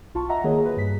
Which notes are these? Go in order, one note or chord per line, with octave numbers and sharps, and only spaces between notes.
B1 F4 A5 C#6
D#5 E5 F#5 A#5 A#6
D#3 A#3 F#4 G#4 C#5 D#5
B4
G2 B6